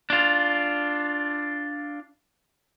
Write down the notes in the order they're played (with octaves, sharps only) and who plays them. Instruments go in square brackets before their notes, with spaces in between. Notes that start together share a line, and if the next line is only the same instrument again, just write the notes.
[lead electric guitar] D4 F4